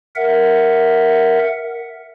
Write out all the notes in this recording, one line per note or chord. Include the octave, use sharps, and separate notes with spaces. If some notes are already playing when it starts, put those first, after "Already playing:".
A#4 E5 F#5